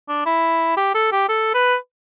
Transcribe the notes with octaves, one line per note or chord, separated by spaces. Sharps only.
D4
E4
G4
A4
G4
A4
B4